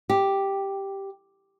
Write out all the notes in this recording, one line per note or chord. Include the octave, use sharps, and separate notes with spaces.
G4